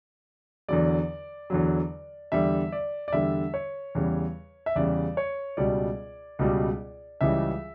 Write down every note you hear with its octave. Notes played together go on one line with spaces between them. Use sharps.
E2 D3 F#3 D5
E2 D3 F#3
E2 D3 G3 E5
D5
D5
E2 D3 G3 E5
C#5
E2 C#3 G3
E5
E2 C#3 G3 D5
C#5
C#2 B2 G3 D5
C#2 B2 G3
C#2 C#3 E3 G3 E5